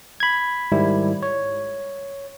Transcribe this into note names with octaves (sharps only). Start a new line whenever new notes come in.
B5 G#6
G#2 D#3 G3 E4
C#5